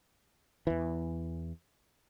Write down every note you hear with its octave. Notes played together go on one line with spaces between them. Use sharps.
E2 E3